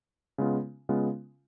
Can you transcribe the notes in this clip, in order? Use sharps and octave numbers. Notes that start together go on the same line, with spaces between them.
C#3 G#3 B3 F4
C#3 G#3 B3 F4